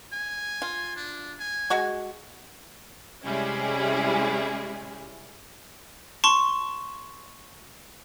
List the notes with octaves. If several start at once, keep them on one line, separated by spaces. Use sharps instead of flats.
G#5
F4
D4
G#5
G#3 F#4 C#6
C3 G3 G#3 C#4 E4 G#4
A5 C6 C#6